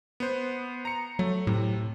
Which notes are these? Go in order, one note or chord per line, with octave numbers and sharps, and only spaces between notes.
B3 C5
A#5 C#7
F#3 A3
A2 C3